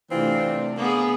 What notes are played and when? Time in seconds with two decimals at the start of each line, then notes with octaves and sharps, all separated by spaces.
0.11 C3 E3 A3 C4 D4 F4
0.78 A#3 B3 G#4